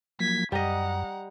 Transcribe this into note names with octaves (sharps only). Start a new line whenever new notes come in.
F3 F#3 A#3 G#6 B6
F#2 G3 D#5 F#5 A#5